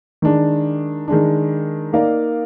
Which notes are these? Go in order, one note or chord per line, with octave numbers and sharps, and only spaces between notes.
D#3 G#3 D4
D#3 G#3 D4
A#3 D#4 A#4 D5 F5